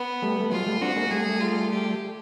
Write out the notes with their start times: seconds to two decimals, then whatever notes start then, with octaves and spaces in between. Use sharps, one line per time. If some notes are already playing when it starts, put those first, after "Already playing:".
Already playing: B3
0.22 G3 A3
0.41 A3
0.52 F#3 G#3 F4
0.66 G3 A3
0.81 C4 D4 F#4
0.96 G#3 A#3
1.11 G3 A3 G#4
1.40 F4
1.70 G4